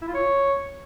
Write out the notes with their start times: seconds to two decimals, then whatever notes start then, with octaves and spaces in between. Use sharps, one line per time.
0.02 E4
0.08 F4
0.14 C#5